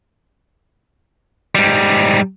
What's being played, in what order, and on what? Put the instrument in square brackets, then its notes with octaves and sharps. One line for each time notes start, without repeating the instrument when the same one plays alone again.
[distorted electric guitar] G#2 G3